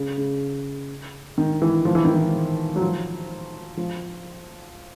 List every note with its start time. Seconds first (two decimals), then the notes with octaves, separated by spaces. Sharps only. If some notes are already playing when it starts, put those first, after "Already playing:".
Already playing: C#3
0.18 C#3
1.38 D#3
1.62 E3
1.85 F3
1.95 E3
2.05 D#3
2.14 E3
2.76 F#3
2.81 F3
3.77 F3